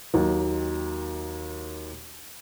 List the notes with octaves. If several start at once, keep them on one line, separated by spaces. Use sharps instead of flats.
D#2 D#3 F#3 A#3